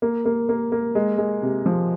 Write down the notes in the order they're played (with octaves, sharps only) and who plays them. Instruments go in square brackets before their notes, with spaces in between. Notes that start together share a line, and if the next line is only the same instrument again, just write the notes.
[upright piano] A#3
A#3
A#3
A#3
G#3
G#3
C3
F3